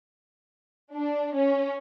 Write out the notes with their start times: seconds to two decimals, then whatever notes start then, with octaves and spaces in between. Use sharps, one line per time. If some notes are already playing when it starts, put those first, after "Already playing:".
0.95 D4
1.37 C#4